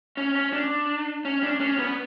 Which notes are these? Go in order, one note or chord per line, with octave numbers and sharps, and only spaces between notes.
C#4
C#4
D4
C#4
D4
C#4
B3